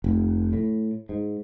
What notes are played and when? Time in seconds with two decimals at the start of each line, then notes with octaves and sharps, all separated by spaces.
0.04 F1
0.53 A2
1.09 G#2